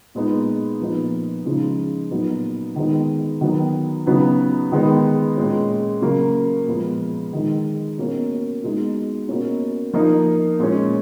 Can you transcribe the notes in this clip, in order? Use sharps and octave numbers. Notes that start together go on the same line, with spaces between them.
A#2 G#3 B3 D#4
A#2 F3 B3 D#4
C#3 F3 G#3 D#4
A#2 F#3 B3 D#4
D#3 G#3 B3 D#4
D#3 F#3 B3
C#3 F#3 B3 D#4
D#3 G#3 B3 D#4
A#2 G#3 C#4
C#3 F#3 A#3
A#2 F3 G#3 B3
D#3 G#3 D#4
B2 A#3 C#4
B2 G#3 D#4
B2 A#3 C#4
F3 A#3 D#4
A#2 G#3 C#4